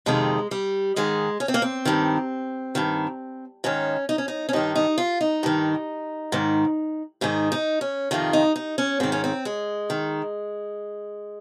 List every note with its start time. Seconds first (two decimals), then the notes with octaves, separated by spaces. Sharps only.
0.06 F2 C3 D#3 G#3
0.51 G3
0.96 G#2 D#3 G#3
1.40 C#4
1.48 C4
1.54 A#3
1.62 C4
1.85 G2 D#3
2.75 G2 D#3
3.64 G#2 D#3 C#4
4.09 D#4
4.18 C#4
4.28 D#4
4.49 C#4
4.53 G2 D#3 D#4
4.75 D#4
4.98 F4
5.21 D#4
5.43 G2 D#3
6.32 G#2 D#3
7.21 G#2 D#3 D#4
7.52 D#4
7.81 C#4
8.11 F2 C3 D#3 F4
8.33 D#4
8.56 D#4
8.78 C#4
9.00 G#2 D#3 C4
9.12 C#4
9.24 C4
9.45 G#3
9.90 D#3